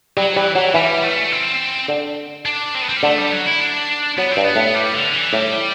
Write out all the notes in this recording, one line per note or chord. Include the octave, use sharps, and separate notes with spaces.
F#3 G3
E3 G3
E3 F#3
E3 G3
A3
C4
D3
D4
C4
B3
C4
G3
D3 A3
G3
F#3
E4
D4
F#3 B3
C4
G2
B3
A2
G3
D3
E3
A2 G3